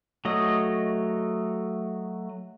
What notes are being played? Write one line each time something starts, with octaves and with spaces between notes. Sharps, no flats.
F#3 A3 D#5